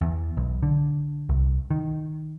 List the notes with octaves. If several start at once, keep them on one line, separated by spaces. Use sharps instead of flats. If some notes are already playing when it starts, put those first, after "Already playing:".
E2
B1
D3
C2
D#3